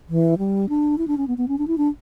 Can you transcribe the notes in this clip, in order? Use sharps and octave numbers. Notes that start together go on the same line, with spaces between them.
E3
G3
D4
E4
D4
C#4
B3
B3
C#4
D4
E4
D4